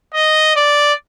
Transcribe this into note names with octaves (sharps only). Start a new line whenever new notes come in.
D#5
D5